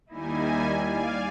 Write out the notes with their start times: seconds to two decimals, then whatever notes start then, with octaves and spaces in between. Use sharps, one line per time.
0.11 D#2 G3 A#3 D#4 E4 G#5
0.80 D5 F5 G#5